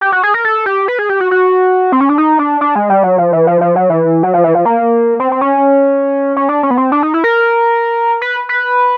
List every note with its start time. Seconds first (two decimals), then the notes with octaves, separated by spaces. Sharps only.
0.01 G4
0.12 F#4
0.23 G#4
0.34 A#4
0.45 A4
0.66 G4
0.88 B4
0.99 G#4
1.09 G4
1.20 F#4
1.31 F#4
1.92 C4
2.01 C#4
2.09 D4
2.18 D#4
2.39 D4
2.61 D4
2.76 G#3
2.90 G3
3.03 F#3
3.18 F3
3.33 E3
3.47 F3
3.61 F3
3.76 F#3
3.90 E3
4.23 F#3
4.34 F3
4.44 E3
4.55 F3
4.65 A#3
5.20 C4
5.32 C4
5.41 C#4
6.36 C#4
6.49 D4
6.63 C#4
6.71 B3
6.77 C4
6.92 D4
7.03 D#4
7.14 E4
7.24 A#4
8.21 B4
8.49 B4